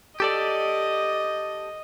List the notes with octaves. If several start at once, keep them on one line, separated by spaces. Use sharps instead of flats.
G4 A4 D5 D#5